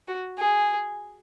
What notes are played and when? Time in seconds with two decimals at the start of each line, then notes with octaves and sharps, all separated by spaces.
0.08 F#4
0.39 G#4